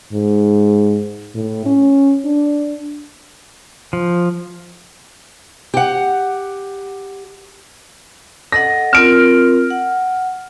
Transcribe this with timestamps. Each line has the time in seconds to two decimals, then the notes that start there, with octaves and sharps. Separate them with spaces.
0.12 G#2
1.35 A2
1.65 C#4
2.25 D4
3.93 F3
5.74 G4 F#5
8.52 A4 D#5 F#5 A#6
8.93 C4 F4 A#4 F6 D7
9.70 F#5